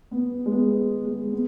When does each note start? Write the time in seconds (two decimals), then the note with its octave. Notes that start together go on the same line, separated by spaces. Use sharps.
0.11 B3
0.46 G#3
0.52 B3
1.05 G#3
1.33 B3